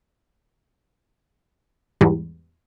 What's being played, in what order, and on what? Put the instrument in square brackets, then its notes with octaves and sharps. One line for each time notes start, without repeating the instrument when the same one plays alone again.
[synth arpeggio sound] E2 G#2 G3